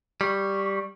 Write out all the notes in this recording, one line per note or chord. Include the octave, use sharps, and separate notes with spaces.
G3 C#6